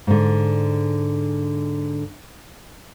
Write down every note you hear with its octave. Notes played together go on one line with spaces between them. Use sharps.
G#2 D3